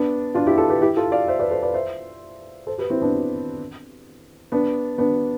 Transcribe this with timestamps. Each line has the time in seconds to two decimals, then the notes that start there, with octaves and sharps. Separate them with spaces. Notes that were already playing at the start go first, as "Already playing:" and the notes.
Already playing: B3 D4
0.35 D4 F4
0.47 E4 G4
0.58 F4 A4
0.69 G4 B4
0.82 E4 G4
0.97 F4 A4
1.12 D5 F5
1.28 C5 E5
1.39 B4 D5
1.51 A4 C5
1.62 B4 D5
1.74 C5 E5
2.67 A4 C5
2.78 G4 B4
2.90 C4 E4
3.02 B3 D4
4.52 B3 D4
4.98 B3 D4